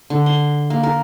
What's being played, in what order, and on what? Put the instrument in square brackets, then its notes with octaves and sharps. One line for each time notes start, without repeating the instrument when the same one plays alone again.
[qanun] D3
C6
A#3
A#4